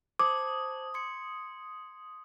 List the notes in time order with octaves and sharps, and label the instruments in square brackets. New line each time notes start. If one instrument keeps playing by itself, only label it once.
[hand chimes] C5 A5 G#6 [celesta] D6 [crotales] D#6
[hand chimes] C6 G#6 C#7